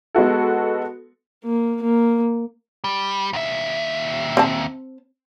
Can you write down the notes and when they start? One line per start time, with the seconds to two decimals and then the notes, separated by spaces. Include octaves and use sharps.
0.15 G#3 B3 F#4 A4
1.45 A#3
1.83 A#3
2.84 G3
3.33 D#2 E5
4.37 C4 A5